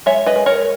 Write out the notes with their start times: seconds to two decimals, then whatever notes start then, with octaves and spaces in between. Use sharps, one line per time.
0.06 G#3 C#5 E5
0.26 B4 D#5
0.36 G#3
0.46 A#4 C#5